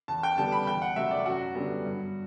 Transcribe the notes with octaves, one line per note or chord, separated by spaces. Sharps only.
E2 A5
G5
D3 G3 B3 A5
B5
E2 G5
F#5
C3 F#3 A3 E5
D5
F#2 F#4
D3 G3 B3
G2